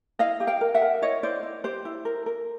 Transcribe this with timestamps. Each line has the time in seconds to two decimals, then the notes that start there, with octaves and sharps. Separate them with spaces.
0.19 E4 D#5 F5
0.40 G4
0.47 F5 G5
0.61 A#4
0.74 E5 F#5
0.82 A#4
1.02 E4 C#5 D#5
1.23 E4 C5 D5
1.43 E4
1.64 G4 C5
1.85 E4
2.05 A#4
2.26 A#4